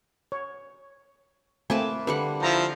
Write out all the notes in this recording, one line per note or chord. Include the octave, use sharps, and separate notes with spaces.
C#5
A3 A#3 C4 B4 G#5 A5
D3 G3 B4 F#5
F3 E4 A#5